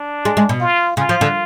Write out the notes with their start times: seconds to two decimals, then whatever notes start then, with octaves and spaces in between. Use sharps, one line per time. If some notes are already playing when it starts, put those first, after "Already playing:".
Already playing: D4
0.25 G#3
0.37 G#3
0.49 B2
0.61 F4
0.97 C#3 F4
1.09 F3
1.21 D3